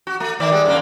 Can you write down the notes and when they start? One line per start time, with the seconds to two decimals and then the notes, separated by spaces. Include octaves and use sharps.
0.07 F#4
0.20 A3
0.40 D#3 D5 E5
0.52 G3 G#3
0.65 F#2 D3 A#3